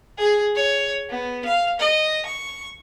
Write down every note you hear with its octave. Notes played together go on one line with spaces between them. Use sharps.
G#4
C#5
B3
F5
D#5
C#6